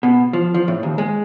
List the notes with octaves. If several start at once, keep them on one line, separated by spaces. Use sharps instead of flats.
B2
F3
F3
A2
D#2
G#3